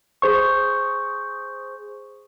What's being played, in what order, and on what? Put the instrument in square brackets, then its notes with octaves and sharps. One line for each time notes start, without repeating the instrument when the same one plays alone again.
[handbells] G#4 C5 C#6